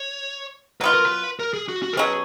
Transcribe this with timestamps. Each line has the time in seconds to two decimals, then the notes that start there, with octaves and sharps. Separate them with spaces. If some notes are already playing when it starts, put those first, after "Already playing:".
Already playing: C#5
0.81 F#3 B3 F4 B4
0.94 A#4
1.06 B4
1.39 A#4
1.53 G#4
1.69 F#4
1.83 F#4
1.93 A#4
1.97 B2 F#3 C#4 G#4